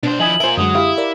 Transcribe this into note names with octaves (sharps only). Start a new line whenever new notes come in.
B2 D4 C5
F3 E4 D#5 G#5 D#6 F#7
F4 A#4 C5 E5 G#5
F#2 D3 F#3 G#3 D#6
E4 G4 F5
A#4 D5